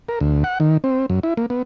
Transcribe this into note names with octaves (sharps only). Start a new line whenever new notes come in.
A#4
D2
F#5
D#3
C4
F#2
E4
A#3
B3